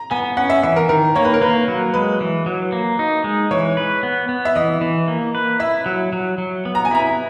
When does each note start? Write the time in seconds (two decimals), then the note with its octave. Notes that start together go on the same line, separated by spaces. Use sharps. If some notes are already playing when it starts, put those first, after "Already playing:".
Already playing: A#5
0.11 B3 G#5
0.37 C#4 F#5
0.50 E5
0.63 E3 E5
0.76 A#4
0.89 D#3 A#4
1.16 A#3 C#5
1.25 B4
1.34 A#4
1.41 A#3 B4
1.68 F#3
1.94 G#3 B4
2.21 E3
2.46 F#3
2.72 A#3
2.99 D#4
3.24 G#3
3.51 E3 C#5
3.77 B4
4.03 B3
4.29 B3
4.45 E5
4.56 E3 D#5
4.81 E3
5.08 A#3
5.35 B4
5.60 E4 E5
5.86 F#3
6.13 F#3
6.38 F#3
6.65 B3
6.75 A#5
6.85 G#5
6.91 E4 A#5